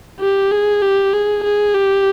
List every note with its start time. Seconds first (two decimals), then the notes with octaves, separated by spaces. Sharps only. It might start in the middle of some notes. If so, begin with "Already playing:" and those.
0.20 G4
0.51 G#4
0.82 G4
1.13 G#4
1.44 G#4
1.75 G4